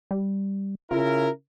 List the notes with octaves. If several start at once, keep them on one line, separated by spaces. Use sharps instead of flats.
G3
C#3 E4 F4 A#4